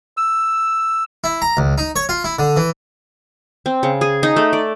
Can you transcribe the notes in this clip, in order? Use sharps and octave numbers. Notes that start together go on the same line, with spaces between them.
E6
E4
A#5
C#2
D#4
C#5
F4
E4
D3
E3
C4
C#3
G#4
D#4
A3
D5